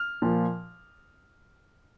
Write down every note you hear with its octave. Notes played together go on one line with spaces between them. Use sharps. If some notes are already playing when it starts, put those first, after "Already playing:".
Already playing: F6
A#2 F3